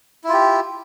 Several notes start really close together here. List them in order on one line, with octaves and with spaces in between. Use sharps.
E4 F4 G4